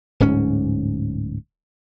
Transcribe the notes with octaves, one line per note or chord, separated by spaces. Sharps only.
D1 G#2 C#4